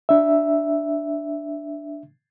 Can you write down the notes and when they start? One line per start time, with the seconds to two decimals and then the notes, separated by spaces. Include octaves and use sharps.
0.09 D4 E5